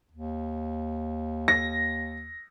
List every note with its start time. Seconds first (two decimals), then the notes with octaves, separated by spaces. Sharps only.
0.12 D#2
1.48 A#6